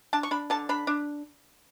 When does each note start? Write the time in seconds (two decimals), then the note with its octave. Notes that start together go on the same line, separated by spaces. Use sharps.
0.13 D4 A5
0.23 C#6
0.31 D4 B5
0.50 D3 A5
0.69 D4 B5
0.87 D4